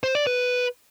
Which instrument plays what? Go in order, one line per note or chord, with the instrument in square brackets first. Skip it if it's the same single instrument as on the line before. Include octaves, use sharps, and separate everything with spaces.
[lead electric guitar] C5
D5
B4